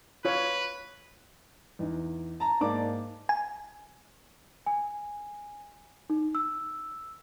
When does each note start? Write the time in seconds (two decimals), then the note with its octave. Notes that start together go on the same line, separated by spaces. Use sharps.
0.25 F4 B4 C#5
1.79 E2 D#4
2.40 A5 A#5
2.60 G#2 A#3 D5 A5 D6
3.29 G#5
4.66 G#5
6.10 D#4
6.35 E6